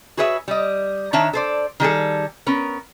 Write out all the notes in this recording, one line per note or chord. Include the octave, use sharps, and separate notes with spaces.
F#4 G#4 B4 C#5 D#5 E5
G3 D#5
D#3 D4 C#5 E5 A5
A4 C5 D5
D#3 G3 G#4 A4
B3 C#4 A#4